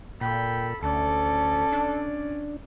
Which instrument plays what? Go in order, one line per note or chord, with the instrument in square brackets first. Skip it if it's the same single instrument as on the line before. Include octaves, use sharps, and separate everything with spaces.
[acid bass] A#2 [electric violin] A4 B5 [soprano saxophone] G5
[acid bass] D2 [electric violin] C#4 D5 [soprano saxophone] A4
[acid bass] D4